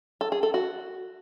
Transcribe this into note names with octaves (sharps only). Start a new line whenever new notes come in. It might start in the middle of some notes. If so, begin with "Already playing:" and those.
A4
G#4
A4
F#4